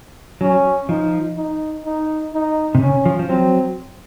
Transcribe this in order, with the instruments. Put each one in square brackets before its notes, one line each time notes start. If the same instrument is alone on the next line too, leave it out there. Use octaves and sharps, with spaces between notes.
[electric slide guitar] F#3 [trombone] C#4
[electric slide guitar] F3 [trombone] D#4
[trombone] D#4
D#4
D#4
[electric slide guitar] C3
[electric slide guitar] C#3 [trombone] C#4
[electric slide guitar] F3
F3
[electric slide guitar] F#3 [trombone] C4